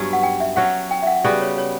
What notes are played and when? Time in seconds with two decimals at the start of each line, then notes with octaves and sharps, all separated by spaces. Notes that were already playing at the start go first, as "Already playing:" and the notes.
Already playing: G2 F#3 B3 C#4
0.13 F#5
0.23 G5
0.40 E5
0.56 F#3 C#4 F#4 F#5
0.91 G5
1.02 E5
1.07 F#5
1.24 C#3 G3 B3 F#4 D5
1.41 C#5
1.58 C#5